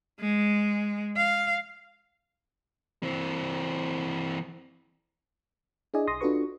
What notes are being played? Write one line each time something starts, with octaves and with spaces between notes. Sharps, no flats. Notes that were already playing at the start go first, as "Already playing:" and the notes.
G#3
F5
E3 C4
D4 E4 G#4 D5 D#5 G#5
B1 C6 D#6 A#6
D4 F4 F#4 A4 B4 C#6